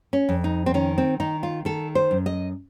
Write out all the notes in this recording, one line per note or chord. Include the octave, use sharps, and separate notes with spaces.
C#4
F2
D#4
C4
D#3 C#4
C4
D#3 D#4
F4
D#3 A4
C5
F#2
D#5